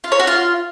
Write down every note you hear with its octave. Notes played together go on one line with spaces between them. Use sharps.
F4
C#5
F#4
F4